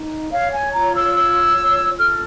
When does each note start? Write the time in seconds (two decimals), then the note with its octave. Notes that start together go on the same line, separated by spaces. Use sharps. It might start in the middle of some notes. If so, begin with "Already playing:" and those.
Already playing: D#4
0.32 C#5 F5
0.53 G#5
0.74 F4 A#5
0.95 E6
1.15 C#5 E6
1.56 F4
1.98 A4 F6